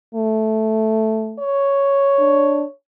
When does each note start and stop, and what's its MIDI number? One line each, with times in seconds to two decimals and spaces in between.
0.15 1.38 57
1.39 2.73 73
2.19 2.64 62